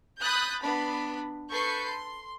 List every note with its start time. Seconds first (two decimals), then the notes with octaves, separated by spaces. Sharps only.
0.20 B5 D#6 F#6 G6 A6
0.63 B3 D4 B5
1.51 A4 B4 C#6 G6 C7
1.88 C6